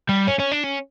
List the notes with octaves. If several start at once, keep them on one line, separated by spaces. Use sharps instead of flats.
G3
C#4
C#4
D4
C#4